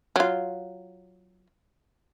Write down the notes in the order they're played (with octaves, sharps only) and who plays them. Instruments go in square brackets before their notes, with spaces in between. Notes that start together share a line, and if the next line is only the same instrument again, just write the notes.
[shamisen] F#3 F4